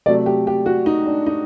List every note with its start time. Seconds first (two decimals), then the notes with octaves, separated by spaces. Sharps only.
0.06 C3 F#3 A3 D5
0.26 G4
0.47 G4
0.66 F#4
0.86 D#4
1.06 D4
1.26 D#4